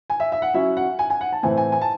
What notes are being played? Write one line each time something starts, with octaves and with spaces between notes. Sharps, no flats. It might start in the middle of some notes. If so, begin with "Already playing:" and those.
G#5
E5
E5
F#5
F#3 C#4 E4 E5
F#5
G#5
G#5
F#5
A5
A2 E3 C4 G#5
G#5
G#5
A5